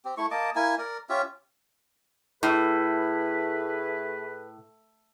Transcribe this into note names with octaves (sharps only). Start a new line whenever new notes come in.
C4 G4
A3 E4 C#6
A#3 D#5 A5 D6
A#3 E4 G#5
A#4 D5
C#4 F4 G4 E5
A2 A3 G#4 B4